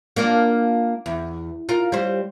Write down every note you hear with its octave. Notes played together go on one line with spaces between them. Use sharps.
A#3 D4 F4
E2
F4 A#4
G3 C4